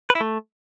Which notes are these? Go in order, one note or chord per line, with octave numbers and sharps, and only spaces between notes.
B4
E4
A3